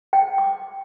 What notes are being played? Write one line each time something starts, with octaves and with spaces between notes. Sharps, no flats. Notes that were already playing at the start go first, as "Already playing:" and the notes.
G5
D6